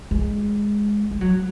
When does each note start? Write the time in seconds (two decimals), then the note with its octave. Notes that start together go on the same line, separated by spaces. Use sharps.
0.11 G#3
1.11 G#3
1.21 F#3